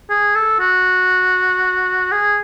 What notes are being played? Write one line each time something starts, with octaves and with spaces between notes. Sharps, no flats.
G#4
A4
F#4
G#4